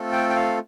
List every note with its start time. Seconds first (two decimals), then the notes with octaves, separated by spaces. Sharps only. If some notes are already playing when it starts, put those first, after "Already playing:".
Already playing: A3 C4 F4 A4
0.12 G5
0.30 G5
0.36 F5